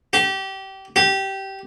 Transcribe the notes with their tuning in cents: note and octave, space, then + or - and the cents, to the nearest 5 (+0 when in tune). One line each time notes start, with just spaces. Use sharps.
G4 -25
G4 -15